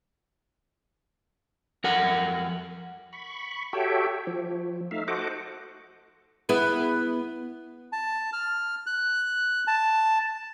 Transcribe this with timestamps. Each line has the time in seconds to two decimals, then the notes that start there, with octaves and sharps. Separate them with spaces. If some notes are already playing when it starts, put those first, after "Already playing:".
1.84 F2 A#4 F#5
3.13 B5 C#6
3.73 F#4 G4 A4 C#5 E5 G5
4.27 F3
4.91 A3 D#4 E5 F5
5.08 F#4 A4 C5 D#5 F#5 D6
6.49 B3 E4 G#4
7.93 A5
8.33 F6
8.87 F#6
9.67 A5